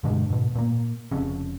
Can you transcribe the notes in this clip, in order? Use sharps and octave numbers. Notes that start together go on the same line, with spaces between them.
G2 B2 D3 G#3
G#2 B2
A#2 A#3
F1 F2 C#3